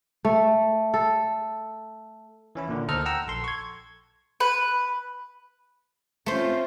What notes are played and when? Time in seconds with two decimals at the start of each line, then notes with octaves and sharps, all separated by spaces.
0.25 A3
0.94 A4
2.55 E3 C#4 E4
2.68 A#2 D3 D#3
2.88 D2 D#4 A4 C5 D#5 F6
3.05 F#5 G5 A#5 E6
3.27 A#1 A4 C6
3.44 C#6 G#6
4.40 B4
6.26 A3 C4 C#4 F4 C5